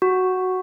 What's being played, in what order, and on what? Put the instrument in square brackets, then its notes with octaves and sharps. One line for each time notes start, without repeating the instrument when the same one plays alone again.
[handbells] F#4